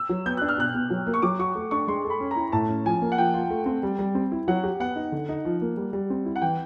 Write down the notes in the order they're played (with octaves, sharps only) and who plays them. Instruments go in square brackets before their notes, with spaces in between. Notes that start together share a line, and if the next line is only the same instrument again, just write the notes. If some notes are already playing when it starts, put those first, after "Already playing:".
Already playing: [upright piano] E6
[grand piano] F#3
[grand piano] B3 [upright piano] G6
[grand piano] D4 [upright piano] F#6
[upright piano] F6
[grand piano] B2 [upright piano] F#6
[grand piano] B2
F#3
A#3
[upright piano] C#6
[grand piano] F#3 [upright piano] D6
[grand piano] F#4 [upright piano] C#6
[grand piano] A3
[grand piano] D4 [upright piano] C#6
[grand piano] G#3 [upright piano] C6
[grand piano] A4
[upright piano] B5
[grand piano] C#4
[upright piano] A#5
[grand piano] E4
[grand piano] A2 [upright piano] A5
[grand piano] C#4
[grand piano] F3 [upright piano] G#5
[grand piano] A#3
[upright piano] F#5
[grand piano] F3 [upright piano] G5
[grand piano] F4
A3
C4
G3
G3
C4
E4
[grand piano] F#3 [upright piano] F#5
[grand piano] G4
[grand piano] B3 [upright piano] F#5
[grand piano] D#4
D3
D#4
F3
A#3
G3
G3
C4
E4
[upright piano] F#5
[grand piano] E3 [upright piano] G5